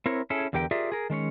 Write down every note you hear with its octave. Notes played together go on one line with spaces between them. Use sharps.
C4 E4 A#4 C#5
C#4 E4 G#4 A4
E2 D3 G4 A#4 G5
F4 G4 G#4 A#4 D5 E5
G#4 A#4
D#3 G#3 C#4 C#5